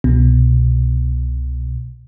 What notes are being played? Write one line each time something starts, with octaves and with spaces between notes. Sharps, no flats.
C2 B2